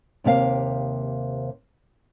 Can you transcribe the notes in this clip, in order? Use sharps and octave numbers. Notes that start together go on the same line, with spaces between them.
D#2 C3 A#3 F5